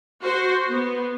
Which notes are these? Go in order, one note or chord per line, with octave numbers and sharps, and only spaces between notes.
F#4 C5
B3